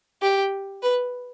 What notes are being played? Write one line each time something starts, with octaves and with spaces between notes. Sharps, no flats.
G4
B4